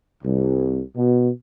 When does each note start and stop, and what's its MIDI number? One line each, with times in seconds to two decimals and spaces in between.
0.24 0.81 36
0.96 1.29 47